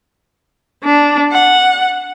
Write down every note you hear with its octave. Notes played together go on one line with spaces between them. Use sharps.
D4
F#5